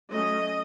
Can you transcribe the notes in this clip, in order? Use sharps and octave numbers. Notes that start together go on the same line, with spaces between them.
F#3 A3 C#4 D#5